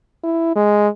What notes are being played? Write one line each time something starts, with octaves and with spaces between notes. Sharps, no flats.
E4
G#3